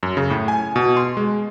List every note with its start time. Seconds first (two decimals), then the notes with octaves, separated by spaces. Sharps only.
0.03 F#2
0.17 C#3
0.30 A2
0.48 G#5
0.76 B2
0.97 C6
1.17 G#3